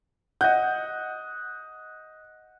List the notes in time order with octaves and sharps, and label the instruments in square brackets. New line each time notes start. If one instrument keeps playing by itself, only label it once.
[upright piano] D#5 G6 [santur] F#5